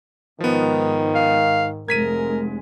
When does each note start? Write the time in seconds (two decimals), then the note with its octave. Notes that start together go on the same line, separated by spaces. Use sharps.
0.40 G#2 D#3 F3 B3
1.15 F5
1.88 F1 G#3 A#4 G#6 B6 D#7